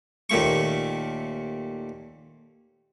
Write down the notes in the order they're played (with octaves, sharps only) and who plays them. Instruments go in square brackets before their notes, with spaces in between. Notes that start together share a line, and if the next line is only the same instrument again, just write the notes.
[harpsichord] D#2 A#2 A3 C#6